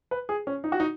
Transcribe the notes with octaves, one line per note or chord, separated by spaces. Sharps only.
B4
G#4
C#4
D#4
F#4
D#4